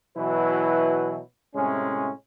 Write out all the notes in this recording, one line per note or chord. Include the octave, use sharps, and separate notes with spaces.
B2 E3 F#3 E4 B4
A2 C3 G#3 C#4